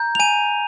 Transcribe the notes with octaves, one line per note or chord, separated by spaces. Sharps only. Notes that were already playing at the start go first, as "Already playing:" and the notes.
Already playing: A#5 G6
F7
G#5 D#7